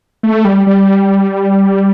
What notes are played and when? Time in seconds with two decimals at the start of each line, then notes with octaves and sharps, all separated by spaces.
0.23 A3
0.45 G3
0.67 G3